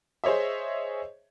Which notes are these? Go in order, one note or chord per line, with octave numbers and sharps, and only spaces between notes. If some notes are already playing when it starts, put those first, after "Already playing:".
G#4 C5 C#5 D#5 E5